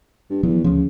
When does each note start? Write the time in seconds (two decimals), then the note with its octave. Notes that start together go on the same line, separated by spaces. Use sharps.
0.30 G2
0.43 E2 F3 F#3 B3
0.64 D2 C#3 F3